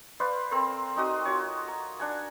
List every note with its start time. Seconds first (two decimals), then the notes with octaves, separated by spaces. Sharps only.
0.20 B4 C5 D5 F5
0.51 C4 A4 A#4 C5
0.96 C4 D#4 F#4 D#6
1.25 F4 F#4 C#5
1.68 A#5
1.99 D4 F#5 G#5